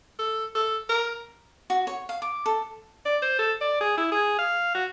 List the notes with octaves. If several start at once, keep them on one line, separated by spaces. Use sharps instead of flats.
A4
A4
A#4
F#4
C#5
F5
D6
A4
D5
C5
A4
D5
G#4
E4
G#4
F5
F#4